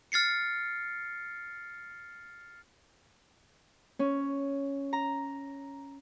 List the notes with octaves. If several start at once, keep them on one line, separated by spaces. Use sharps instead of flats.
F6 A6 C7 C#7
C#4
A#5